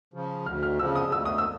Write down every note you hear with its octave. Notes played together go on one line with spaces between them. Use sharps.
C#3 F3
D2 F6
F6
C#3 F3 E6
D#6
D2 E6
D#6
E6